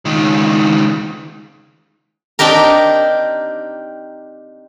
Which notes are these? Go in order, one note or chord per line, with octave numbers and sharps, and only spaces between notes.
C#2 D#3
C4 D4 D#4 G4 A#4